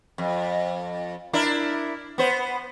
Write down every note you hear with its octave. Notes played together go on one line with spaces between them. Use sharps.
F2
D4 E4 A#4
B3 C5